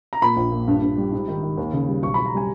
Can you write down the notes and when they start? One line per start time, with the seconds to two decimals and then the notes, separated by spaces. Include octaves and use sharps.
0.13 A#5
0.22 A#2 B5
0.36 A#1
0.52 A#2
0.68 G2
0.82 G2
0.97 G3
1.12 G#2
1.28 D#3
1.43 D#3
1.57 D#2
1.73 C#3
1.88 G3
2.03 B1 C#6
2.14 B1 B5
2.26 A#5
2.34 G3 G#5